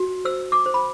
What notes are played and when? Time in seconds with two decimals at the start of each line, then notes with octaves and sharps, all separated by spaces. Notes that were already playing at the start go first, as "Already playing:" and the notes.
Already playing: F#4
0.25 C5 E6
0.52 D6
0.66 C5
0.74 B5